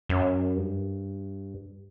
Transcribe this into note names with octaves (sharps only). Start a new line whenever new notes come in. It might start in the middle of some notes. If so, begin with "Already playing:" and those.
F#2
G2